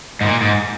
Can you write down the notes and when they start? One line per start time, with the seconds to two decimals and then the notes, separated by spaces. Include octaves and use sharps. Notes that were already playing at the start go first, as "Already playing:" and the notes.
0.21 G#2
0.25 A#2
0.41 G#2